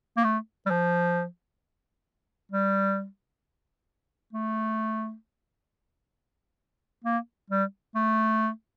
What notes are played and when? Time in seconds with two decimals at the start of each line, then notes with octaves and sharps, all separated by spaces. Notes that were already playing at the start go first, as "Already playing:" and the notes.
0.17 A#3
0.24 A3
0.66 G3
0.70 F3
2.51 G3
4.32 A3
7.04 A#3
7.50 G3
7.95 A3